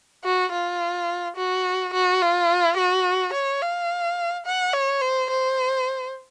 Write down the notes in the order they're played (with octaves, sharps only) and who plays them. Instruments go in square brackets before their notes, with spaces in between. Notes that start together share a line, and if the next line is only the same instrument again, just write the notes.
[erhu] F#4
F4
F#4
F#4
F4
F#4
C#5
F5
F#5
C#5
C5
C5